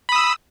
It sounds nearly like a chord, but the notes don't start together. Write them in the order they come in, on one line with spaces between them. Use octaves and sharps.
B5 D#6 E6